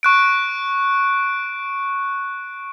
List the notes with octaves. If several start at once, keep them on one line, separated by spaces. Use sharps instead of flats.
C#6 F#6 D7